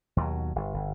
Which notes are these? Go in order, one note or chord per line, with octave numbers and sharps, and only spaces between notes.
D#2 B2 F#3
G1
G1